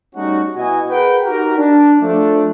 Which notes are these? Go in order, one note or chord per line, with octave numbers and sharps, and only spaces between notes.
G3 A3 C#4 D#4 F#4
B2 E4 F#4 D#5 G#5
G#4 A#4 B4 F#5 G5
D#4 F#4 G4 A#4
D4
F3 A3 D4